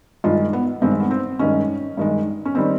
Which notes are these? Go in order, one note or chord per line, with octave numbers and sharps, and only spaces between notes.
G2 D#3 G#3 F4
B3
G2 D#3 G#3 C4
B3
C4
G2 D#3 G#3 C#4
G2 D#3 G#3
C#4
D#3 G3 C4